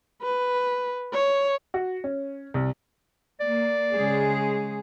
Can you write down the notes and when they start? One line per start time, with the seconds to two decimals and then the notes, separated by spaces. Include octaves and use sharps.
0.22 B4
1.14 C#5
1.74 F#4
2.04 C#4
2.54 C2
3.40 A#3 D5
3.95 C#3 G#3 G#4